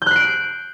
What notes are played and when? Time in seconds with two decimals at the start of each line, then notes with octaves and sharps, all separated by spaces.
0.02 G6
0.06 F#6
0.11 C7
0.16 D7